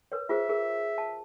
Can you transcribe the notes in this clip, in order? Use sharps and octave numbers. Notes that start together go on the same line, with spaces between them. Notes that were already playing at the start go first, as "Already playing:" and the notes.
A#4 B4 C#5
F4 G#4 C5 E5
G#4 A#4
A5